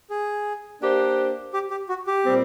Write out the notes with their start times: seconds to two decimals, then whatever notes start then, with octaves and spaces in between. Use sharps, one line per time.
0.10 G#4
0.81 A#3 D4 G4 C5
1.53 G4
1.71 G4
1.89 F#4
2.07 G4
2.24 A#2 G3 C4